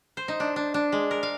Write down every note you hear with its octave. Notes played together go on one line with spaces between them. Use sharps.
C5
D#4
D4
D4
D4
G#3
A#4
F5